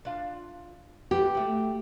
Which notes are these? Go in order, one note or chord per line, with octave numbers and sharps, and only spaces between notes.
D4 F4
E3 B3 G4
F#3 A3